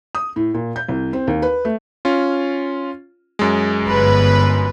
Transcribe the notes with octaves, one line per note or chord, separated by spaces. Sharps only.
D#6
A2
A#2
G6
C2
C4
D#2
B4
A3
C#4 F4
F#2 G#3
G1 B4